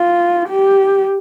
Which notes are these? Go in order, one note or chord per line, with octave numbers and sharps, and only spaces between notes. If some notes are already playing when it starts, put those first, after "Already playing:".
Already playing: F4
G4